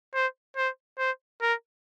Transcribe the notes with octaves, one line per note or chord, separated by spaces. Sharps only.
C5
C5
C5
A#4